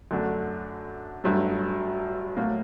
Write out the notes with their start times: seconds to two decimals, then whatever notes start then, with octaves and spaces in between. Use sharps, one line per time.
0.11 F#2 D3 A3 D4 F#4
1.24 A1 G2 F#3 A3
2.37 A2 F#3 A#3